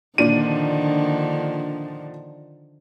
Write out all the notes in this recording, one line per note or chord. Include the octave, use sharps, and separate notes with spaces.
A#2 D3 D#3 F3 D4 D#7